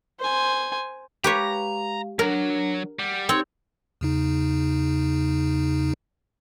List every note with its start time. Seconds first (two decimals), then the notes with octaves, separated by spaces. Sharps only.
0.20 C5 G#5
1.24 G#3 G4 B4 C#5 F5 A#5
2.19 F#3 D4 A#4 F#5
2.99 G3 F#5
3.29 C4 D#4 G4 C#5 C6
4.01 E2 C#3 D#4